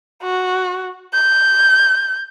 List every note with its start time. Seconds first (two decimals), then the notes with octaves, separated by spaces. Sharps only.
0.23 F#4
1.14 G6